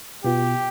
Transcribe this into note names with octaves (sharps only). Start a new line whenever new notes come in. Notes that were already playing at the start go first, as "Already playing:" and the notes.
B2 B3 F4 G4